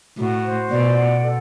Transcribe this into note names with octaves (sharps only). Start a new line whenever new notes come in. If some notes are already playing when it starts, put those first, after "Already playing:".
A2 F#4
C5
B2 D5
F#5
A4